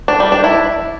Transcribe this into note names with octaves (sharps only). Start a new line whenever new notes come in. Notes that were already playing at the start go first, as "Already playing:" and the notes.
D4
G3
D4
E4